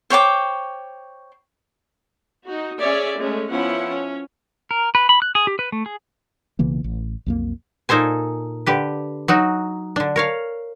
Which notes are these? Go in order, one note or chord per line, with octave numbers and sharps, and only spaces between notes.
C5 C#5 G5 D6
D#4 F#4
C#4 G#4 C#5 D5 E5
G#3 A3 C#4
F3 B3 C#4 E4 F#5
C#4
A#4
B4
B5
F#6
G#4
G4
B4
A3
G#4
B1 C#3 E3 A#3
A1
B1 F2 A#3
A#2 D#4 A4 C5 G#5
D3 G4 B4
F#3 D#4 F#4
D3 D4
A#4 C#5 F5